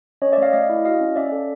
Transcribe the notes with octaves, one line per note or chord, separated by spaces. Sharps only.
C#4 C#5 D#5
D5 E5
A3 D#5 F5
A3 D#5 F5
E4
F#4 D#5 F5
C#4
C#4 D5 E5
A4